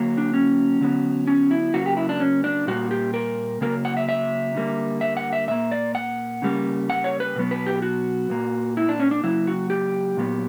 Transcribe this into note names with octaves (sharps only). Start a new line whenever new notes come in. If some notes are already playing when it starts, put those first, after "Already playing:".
Already playing: D3 F#3 A#3
D4
C#4
D3 F#3 B3
C#4
E4
C#3 F#3 A#3 F#4
G4
E4
D4
C#4
D4
A#2 G3 A#3 F#4
G4
A#4
C#3 F#3 A#3 A#4
F#5
E5
E5
D3 G3 A#3
E5
F#5
E5
A#2 A#3 E5
D5
F#5
C#3 G3 A#3
F#5
C#5
B4
B2 F#3 B3
B4
G4
F#4
A#2 A#3
E4
D4
C#4
D4
C#3 F#3 A#3 E4
F#4
G4
A#2 F#3 B3